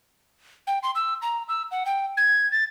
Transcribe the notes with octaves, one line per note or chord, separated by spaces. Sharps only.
G5
C6
E6
A#5
E6
F#5
G5
G#6
A6